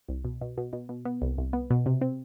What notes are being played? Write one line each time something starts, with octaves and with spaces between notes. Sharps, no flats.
C2
B2
B2
B2
B2
B2
B3
C2
C2
B3
B2
C3
C4